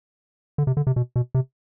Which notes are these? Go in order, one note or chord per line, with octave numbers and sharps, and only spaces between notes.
D3
C3
D3
C3
B2
B2
C3